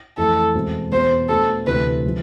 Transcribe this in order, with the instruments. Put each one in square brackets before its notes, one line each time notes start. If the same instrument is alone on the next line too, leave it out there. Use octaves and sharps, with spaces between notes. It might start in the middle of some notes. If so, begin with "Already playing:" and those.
[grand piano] F2 E3 A3 E4 [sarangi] A4
[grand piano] E2 B2 G#3 C4
[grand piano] E2 B2 B3 [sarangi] C5
[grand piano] B2 A3 D4 [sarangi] A4
[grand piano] D2 C3 E3 A3 [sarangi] B4
[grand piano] F3 G#3